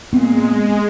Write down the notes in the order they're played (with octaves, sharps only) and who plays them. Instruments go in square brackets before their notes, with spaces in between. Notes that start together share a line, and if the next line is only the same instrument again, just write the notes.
[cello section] A#2 [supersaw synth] G#3 [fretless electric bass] B3 C4